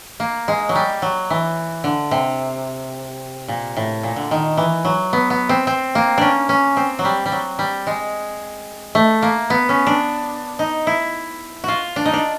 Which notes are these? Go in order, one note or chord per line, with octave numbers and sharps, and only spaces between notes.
A#3
G#3
F#3
G3
F#3
E3
D3
C3
A#2
A2
A#2
D3
D#3
E3
F#3
B3
B3
C4
C4
A#3
C#4 D4
C#4
C4
F#3
G3
G3
F#3
G3
G#3
A3
A#3
B3
C#4
D4
D#4
E4
F4 F#4
D4
D#4
D4